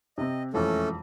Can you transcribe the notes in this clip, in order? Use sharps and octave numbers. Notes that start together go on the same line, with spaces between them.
C3 C4 D#5
E1 F2 E3 A3 C#4 A4